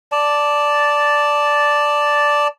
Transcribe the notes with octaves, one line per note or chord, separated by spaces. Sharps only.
D5 A5